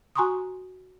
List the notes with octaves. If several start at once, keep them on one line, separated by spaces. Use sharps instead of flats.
F#4 G#5 A#5 C6 C#6 D#6